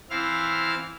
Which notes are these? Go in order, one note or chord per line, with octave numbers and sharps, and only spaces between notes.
E3 C4 E4 F5 F6